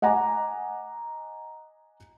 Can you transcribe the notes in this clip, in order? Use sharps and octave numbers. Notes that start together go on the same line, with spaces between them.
D#5 F#5 G#5 A#5 D6